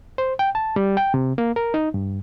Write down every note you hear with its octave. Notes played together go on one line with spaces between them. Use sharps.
C5
G5
A5
G3
G5
C3
A#3
A#4
D#4
G2